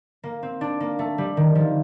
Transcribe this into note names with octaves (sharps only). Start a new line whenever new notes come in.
A#3
C4
D4
A#3
A3
G3
D#3
F3